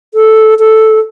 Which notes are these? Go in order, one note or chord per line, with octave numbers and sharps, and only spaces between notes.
A4
A4